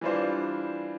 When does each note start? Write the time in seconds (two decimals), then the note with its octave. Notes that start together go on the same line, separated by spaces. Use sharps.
0.01 E3 G3 D4 F4 C5